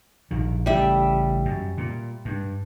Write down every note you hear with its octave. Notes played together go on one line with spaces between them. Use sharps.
A#1 D#3
A1 C#3 G3 E5
F#2
A#2
G2